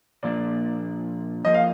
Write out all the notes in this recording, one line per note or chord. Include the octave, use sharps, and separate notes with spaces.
A#2 F3 A#3 D4 D5
F2 F3 A#3 D#5
F5